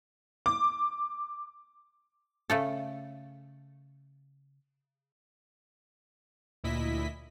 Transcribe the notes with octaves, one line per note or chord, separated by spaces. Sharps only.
D6
C#3 A3 A4
D2 A#2 E4 D#5 B6